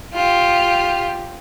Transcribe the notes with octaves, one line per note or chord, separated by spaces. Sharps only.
F4 G4